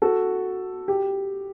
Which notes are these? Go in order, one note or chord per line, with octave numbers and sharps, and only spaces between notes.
F#4 A4
G4